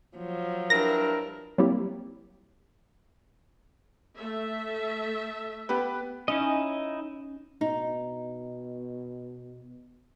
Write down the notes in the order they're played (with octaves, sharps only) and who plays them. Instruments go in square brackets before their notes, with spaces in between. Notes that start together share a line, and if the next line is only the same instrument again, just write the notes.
[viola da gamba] F3 F#3
[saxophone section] G2 E4 A#4 [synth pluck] A#6
[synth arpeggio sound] F#3 G3 A#3 C4 E4 G4
[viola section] A3 E5
[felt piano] B3 G4 B4
[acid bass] C#4 [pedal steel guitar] D#4 E4 D#5
[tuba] B2 [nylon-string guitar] D#4